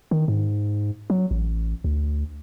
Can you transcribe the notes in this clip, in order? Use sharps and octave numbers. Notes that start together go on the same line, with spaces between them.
D#3
G#2
F#3
A1
D2